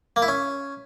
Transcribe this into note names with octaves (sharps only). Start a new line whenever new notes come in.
A#3
E4
C#4